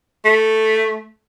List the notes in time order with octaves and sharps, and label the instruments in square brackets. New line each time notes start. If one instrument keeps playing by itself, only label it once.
[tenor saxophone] A3